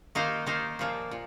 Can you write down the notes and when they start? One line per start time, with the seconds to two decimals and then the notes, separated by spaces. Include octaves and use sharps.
0.15 D#3 A#3 D#4 C5
0.46 D#3 A#3 D#4 C5
0.79 A#2 F3 A#3
1.11 A#2